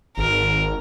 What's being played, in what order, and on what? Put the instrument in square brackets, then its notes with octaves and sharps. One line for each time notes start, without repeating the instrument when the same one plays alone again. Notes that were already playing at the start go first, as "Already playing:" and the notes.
[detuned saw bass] G#1 [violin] A#4